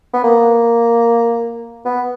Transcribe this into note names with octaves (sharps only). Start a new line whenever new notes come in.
B3
A#3
B3